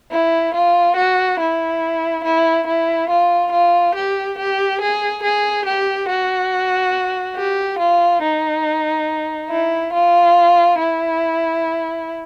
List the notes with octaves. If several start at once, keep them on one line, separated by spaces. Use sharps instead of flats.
E4
F4
F#4
E4
E4
E4
F4
F4
G4
G4
G#4
G#4
G4
F#4
G4
F4
D#4
E4
F4
E4